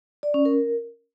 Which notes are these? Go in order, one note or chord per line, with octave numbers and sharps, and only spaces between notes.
D5
C#4
A#4